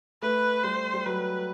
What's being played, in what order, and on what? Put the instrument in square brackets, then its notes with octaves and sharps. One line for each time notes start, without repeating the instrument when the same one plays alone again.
[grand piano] A3 [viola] B4
[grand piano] G3 [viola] C5
[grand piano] G3
[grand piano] F#3 [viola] B4